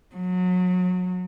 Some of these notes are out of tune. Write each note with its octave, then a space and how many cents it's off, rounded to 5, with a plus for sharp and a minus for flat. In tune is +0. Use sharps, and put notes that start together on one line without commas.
F#3 -30